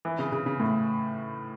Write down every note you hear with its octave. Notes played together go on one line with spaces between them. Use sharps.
E3
C#3
C#3
C#3
A2